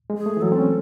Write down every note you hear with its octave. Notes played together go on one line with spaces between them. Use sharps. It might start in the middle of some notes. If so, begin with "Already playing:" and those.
G#3
G#4
A3
E3
F#3 A4
C4
C#4